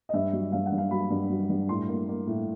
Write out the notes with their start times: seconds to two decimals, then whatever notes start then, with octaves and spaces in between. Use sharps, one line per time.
0.09 D#5
0.13 G2 E5
0.33 F#3
0.52 G2 F5
0.66 F#5
0.72 G2
0.78 F5
0.91 F#3 B5
1.10 G2
1.30 F#3
1.49 G2
1.69 A2 C6
1.88 A#3
2.09 A#3
2.27 A2